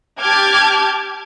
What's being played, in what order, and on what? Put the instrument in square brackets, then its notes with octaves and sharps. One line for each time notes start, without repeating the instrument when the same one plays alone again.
[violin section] G4 A5 D6 F6 G6 G#6